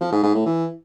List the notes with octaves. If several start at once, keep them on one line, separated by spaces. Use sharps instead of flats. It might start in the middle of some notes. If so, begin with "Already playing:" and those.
F3
G#2
G#2
A2
E3